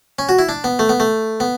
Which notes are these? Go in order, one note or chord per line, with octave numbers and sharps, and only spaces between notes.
C#4
F#4
E4
D4
B3
A3
B3
A3
B3